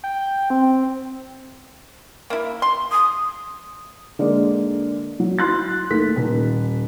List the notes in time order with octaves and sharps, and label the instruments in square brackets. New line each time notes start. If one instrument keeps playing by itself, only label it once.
[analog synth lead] G5
C4
[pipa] A#3 E4
C6
[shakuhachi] D#6
[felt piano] D3 G#3 A#3 D5
F#3
E4 C6 F#6 A6
D#2 A3 B6
D#1